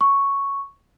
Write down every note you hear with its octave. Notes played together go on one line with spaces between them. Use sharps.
C#6